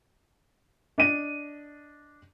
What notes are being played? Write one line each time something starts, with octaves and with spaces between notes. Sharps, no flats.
D4 D#5 D#7